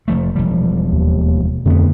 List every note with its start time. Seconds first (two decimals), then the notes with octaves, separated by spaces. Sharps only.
0.08 F1 F3 A3
0.36 E1 F3 G3
0.93 D#2
1.66 F2 D3 A3 B3